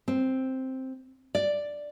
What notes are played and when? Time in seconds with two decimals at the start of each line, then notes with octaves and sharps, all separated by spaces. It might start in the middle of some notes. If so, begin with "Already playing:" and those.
0.08 C4
1.35 D5